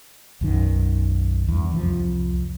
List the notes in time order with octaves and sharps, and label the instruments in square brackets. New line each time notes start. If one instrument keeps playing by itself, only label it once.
[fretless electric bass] B1 F#2 D#3
E2 G2
C2 F2 F3